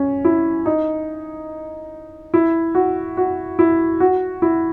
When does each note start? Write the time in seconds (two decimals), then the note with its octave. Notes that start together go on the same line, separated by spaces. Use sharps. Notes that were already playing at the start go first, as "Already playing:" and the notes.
Already playing: C#4
0.25 E4
0.66 D#4
2.34 E4
2.75 F#4
3.17 F#4
3.59 E4
4.00 F#4
4.42 E4